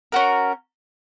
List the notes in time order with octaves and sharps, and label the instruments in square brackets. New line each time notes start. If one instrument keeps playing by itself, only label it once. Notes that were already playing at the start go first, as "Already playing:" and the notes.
[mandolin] C#4 F#4 A#4